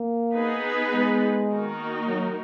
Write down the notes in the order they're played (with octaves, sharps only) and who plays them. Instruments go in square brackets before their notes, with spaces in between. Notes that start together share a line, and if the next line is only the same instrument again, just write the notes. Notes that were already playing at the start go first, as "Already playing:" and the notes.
Already playing: [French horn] A#3
[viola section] B3 D#4 G#4 B4
[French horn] G#3
[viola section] D#3 A#3 D#4 F#4 A#4
[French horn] F#3